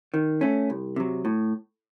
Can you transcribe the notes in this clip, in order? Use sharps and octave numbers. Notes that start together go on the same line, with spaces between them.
D#3
A3 C#4
C2
C3 F#3
A2